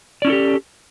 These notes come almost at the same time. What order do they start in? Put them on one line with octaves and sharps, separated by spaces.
D5 C#4 E4 A4 G4